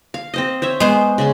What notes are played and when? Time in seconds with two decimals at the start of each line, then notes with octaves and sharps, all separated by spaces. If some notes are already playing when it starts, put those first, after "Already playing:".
0.14 F5
0.34 C4 C5 D#5
0.62 C5 C#5 E5
0.80 G#3 B3 C5
1.18 C#3 G#4 C6